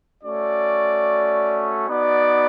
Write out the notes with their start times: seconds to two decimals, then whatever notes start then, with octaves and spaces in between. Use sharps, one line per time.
0.22 A3 C#4 F#4 D5
1.88 B3 D#4 F#4 D5